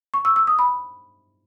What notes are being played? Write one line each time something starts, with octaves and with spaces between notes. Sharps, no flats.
C#6
E6
E6
D#6
B5